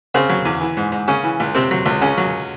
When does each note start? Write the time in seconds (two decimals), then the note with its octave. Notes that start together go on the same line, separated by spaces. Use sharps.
0.14 C#3 C4
0.29 F#3
0.45 E2
0.61 E3
0.77 G#2
0.92 G#2
1.08 C#3 C#4
1.23 E3
1.40 C#2
1.55 C3 C4
1.71 F#3
1.86 C#2
2.01 C#3 C#4
2.17 F#3